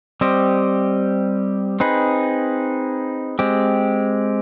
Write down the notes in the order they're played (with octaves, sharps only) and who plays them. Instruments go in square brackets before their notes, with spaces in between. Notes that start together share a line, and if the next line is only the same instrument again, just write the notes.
[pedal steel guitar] G3 C4 G4 C5 D#5
C4 D#4 G#4 B4
G#3 C4 G4